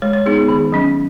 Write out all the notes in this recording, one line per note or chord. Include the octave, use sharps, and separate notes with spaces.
G#3 C#5
C#5
B3 D#4 G#4
G#4
D#3 G#4
F#3 C#4